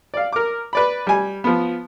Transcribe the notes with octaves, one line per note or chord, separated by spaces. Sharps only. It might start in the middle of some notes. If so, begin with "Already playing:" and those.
D5 F5
A#4 D6
B4 D5 B5
G3 G#5
F3 B3